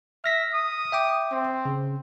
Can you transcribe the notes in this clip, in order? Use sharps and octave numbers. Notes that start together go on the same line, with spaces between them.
E5 F6 A#6 B6
D#6
E5 G5 D6
C4
C#3